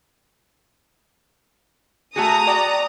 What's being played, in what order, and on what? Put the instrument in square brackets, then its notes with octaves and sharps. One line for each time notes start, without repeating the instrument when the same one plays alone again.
[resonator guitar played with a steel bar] A3 F#4 G#4 [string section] A#5 D#6
[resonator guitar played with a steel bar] F#4 D5 G5